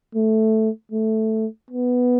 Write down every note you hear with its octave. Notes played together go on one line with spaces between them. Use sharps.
A3
A3
B3